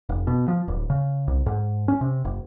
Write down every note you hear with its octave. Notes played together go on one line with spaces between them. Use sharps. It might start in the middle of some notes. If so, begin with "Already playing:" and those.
F1
B2
F3
D1
C#3
C2
G#2
C#4
C3
F#1